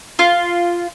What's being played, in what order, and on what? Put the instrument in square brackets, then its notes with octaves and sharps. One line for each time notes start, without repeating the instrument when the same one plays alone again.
[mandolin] F4